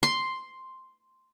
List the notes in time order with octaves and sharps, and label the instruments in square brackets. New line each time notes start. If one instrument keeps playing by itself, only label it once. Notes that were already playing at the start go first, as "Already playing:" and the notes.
[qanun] C6